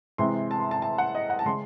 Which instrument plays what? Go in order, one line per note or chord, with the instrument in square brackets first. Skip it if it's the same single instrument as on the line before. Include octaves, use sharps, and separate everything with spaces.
[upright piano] C3 E3 G#3 C4 C6
A5
C6
A5
A5
F#5
D#5
F#5
A5
C#3 G#3 C#4 C6